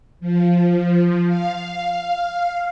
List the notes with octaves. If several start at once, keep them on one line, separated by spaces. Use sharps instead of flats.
F3
F5